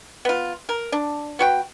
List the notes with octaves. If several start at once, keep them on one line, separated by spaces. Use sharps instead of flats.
B3 F4
A#4
D4
B3 F#4 G5